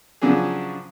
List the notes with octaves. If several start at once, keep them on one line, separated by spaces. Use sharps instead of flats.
C#3 F3 F#3 D4 G#4